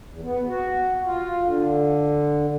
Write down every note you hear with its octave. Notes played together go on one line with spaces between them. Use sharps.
E2
B3
F#4
F4
D3